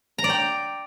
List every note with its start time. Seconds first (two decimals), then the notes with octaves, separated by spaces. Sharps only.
0.18 A#5
0.24 D5
0.29 G5